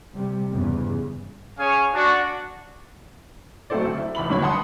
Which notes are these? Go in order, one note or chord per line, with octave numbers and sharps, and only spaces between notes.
C3 G3
E2 G2 C#3
C#4 G#4 C#5 F5 G#5
D4 F#4
F#3 A3 C4 A4 C5 D5
D2
E4
F1 E2 B5 F#7
B1 G2 D3 C#5 B5
F#5 A5 C6 D#6